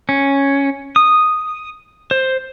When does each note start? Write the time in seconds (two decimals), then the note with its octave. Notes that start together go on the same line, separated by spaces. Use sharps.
0.09 C#4
0.96 D#6
2.11 C5